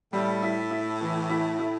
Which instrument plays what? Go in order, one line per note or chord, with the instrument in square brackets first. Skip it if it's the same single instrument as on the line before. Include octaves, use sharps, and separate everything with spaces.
[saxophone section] A2 [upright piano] G3
[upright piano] E4
E4
E3
E4
E4